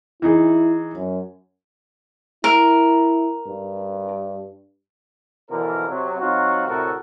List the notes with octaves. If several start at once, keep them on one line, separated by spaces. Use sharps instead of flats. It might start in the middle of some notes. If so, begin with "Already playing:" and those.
E3 D#4 E4 G#4
F#2
E4 A#4
G2
B2 D3 E3 F3 A#4
C3 F#3
F#3 C4 D#4 F4 F#4
D2 A2 C3 F#4 A4 A#4